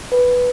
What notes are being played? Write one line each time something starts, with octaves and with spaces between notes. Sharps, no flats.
B4